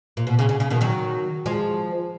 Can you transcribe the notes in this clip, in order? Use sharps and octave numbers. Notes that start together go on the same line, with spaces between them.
A#2
B2
C#3
C#3
C#3
B2 D#3
D#3 F#3
F3 G#3